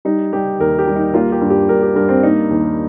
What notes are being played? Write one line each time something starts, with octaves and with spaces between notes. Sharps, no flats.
G3 D#4
G3 G4
D#2 A#4
G4
G3
D#4
A#3 F4
G4
G2
G4
G2 A#4
G4
G2 A#4
C4
A#3 D#4
D#2